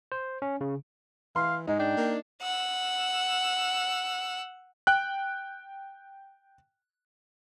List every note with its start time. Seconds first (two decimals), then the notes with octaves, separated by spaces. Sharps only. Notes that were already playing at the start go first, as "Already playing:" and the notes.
0.12 C5
0.42 C#4
0.61 C#3
1.36 E3 F5 C6
1.67 G#2 G#3 D#4
1.80 D4 G5
1.97 A#3
2.42 F#5 E6
4.87 G5 F#6